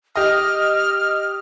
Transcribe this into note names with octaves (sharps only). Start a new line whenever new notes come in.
G4 D#5 F6